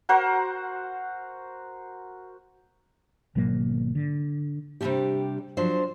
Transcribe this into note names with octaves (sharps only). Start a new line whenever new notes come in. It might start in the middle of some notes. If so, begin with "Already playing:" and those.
F#4 A#4 C5 F#5
G#1 B2 F#3 A#3
D3
C3 G3 A#3 C#4 D4 G4
F3 F#3 D4 C5